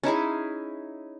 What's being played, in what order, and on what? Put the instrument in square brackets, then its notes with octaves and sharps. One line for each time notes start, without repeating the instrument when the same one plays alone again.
[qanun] C#4 D#4 E4 G#4